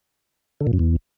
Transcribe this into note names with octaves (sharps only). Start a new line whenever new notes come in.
D3
A#2
F#2
E2